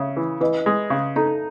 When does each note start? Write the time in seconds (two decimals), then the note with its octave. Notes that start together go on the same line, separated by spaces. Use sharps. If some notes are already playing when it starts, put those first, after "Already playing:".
Already playing: C#3 C#5 E5
0.17 E3
0.40 E3 B4 D#5
0.66 G#3
0.90 C#3
1.16 D#4 A4